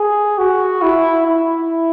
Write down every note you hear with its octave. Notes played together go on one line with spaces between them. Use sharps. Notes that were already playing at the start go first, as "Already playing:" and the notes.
Already playing: G#4
F#4
E4
E4